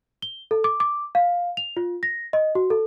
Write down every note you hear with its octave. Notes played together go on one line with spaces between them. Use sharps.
G7
A4
D6
D6
F5
F7
F4
A#6
D#5
F#4
A4